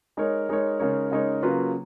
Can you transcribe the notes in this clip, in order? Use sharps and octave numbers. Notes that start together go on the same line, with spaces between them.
G#3 D#4 A#4 C#5
G#3 D#4 A#4 C#5
C#3 G#3 D#4 A#4 C#5
C#3 G#3 D#4 A#4 C#5
C#3 F#3 A#3 F4 B4